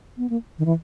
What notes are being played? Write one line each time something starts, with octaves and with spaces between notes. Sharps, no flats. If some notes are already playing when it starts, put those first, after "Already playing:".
B3
A#3
D#3
E3